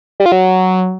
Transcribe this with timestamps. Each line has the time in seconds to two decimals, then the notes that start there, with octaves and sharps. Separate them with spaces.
0.20 G3
0.26 F4
0.32 F#3